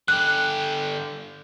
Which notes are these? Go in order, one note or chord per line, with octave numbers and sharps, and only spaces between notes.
D3 G4 F#6